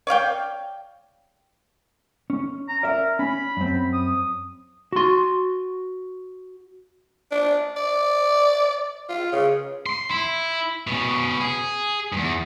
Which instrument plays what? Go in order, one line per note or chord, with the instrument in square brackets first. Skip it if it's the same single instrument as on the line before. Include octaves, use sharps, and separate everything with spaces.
[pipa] C#5 D5 F5 G5
[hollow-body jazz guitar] C#4
[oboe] A#5
[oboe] A#4 [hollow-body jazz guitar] D5 E5
[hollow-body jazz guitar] C#4 [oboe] B5
[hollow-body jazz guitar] F#2 C4
[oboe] D#6
[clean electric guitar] F#4 C6
[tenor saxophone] D4
D5
F4
C#3
[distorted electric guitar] C6
E4
B2 C#4
G#4
E2 G2